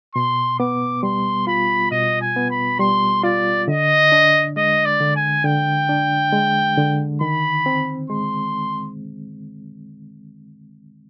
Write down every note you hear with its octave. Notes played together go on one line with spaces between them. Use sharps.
B2 C6
B3 D6
G3 C6
F4 B5
B2 D#5
G#5
B3
B5
G3 C6
F4 D5
D3 D#5
D4
G#3 D#5
D5
D3
G#5
D3 G5
D4
G#3
D3
D#3 B5
C4
G#3 C6